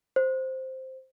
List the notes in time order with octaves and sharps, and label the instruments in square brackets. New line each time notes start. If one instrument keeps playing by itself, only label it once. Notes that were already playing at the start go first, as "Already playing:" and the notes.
[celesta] C5